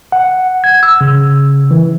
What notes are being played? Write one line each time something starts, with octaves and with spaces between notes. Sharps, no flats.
F#5
G#6
E6
C#3
E3